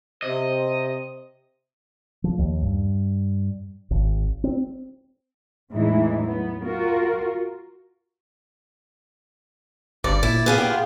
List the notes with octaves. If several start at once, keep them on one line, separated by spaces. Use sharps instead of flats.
C3 C5 D#5
F3
D#2
G2
G#1
C4
E2 A2 E3 G#3 D#4 E4
F#3 B3
F4 F#4 A#4
G1 G2 D5
A#2 E4
B3 G#4 F5
A#2 G4
F4